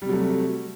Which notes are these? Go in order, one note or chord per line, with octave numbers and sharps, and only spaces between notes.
C3 F#3 G3 A3